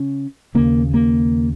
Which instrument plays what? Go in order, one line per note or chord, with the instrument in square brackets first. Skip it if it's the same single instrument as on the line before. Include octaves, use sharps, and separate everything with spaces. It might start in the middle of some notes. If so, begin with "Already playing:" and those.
Already playing: [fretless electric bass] C#3 C#4
D#2 C#3 A#3
A#3